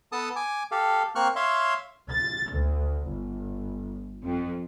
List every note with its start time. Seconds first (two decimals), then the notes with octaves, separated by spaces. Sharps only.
0.12 B3 A4 A5 D#6
0.36 G#5 D6
0.71 G4 A4 F5
1.16 A#3 C4 C#6 F6 F#6
1.36 C#5 E5 F5 C6
2.11 A6
2.51 D2
3.07 G1
4.24 F2